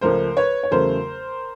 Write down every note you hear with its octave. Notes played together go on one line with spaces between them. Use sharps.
C#2 C#3 F3 A3 A#4 C5
B4 C#5
C#5
E2 C#3 F#3 A3 A#4 C5